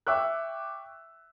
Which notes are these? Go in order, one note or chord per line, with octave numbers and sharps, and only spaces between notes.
E5 G5 C#6 D6 E6 F#6